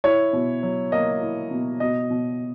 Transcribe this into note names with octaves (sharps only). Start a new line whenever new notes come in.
E4 C#5
B2
F#3
A#3 D#5
E4
B2
B2 D#5
B2